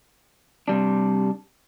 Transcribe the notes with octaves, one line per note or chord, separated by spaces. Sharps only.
C3 G3 D4